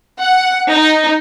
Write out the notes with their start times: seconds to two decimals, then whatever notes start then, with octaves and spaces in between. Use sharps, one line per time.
0.22 F#5
0.71 D#4